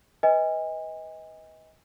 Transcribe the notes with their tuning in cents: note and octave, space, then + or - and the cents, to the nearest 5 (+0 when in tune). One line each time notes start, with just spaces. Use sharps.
B4 +0 D#5 +25 G#5 -30